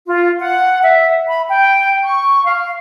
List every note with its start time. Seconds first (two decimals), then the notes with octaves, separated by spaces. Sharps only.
0.06 F4
0.39 F#5
0.82 E5
1.27 B5
1.48 G5
2.05 C#6
2.44 F5